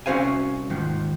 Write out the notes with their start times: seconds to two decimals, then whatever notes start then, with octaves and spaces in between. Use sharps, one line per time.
0.06 C2 C#4 F#4 C5 F5 G#5
0.70 D#2 G#2 D#3 F3